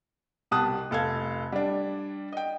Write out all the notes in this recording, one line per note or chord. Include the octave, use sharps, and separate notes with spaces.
C2 B2 G4 A5 D#6 F#6
F1 A4 F5 G#6
G3 D4
D#5 G5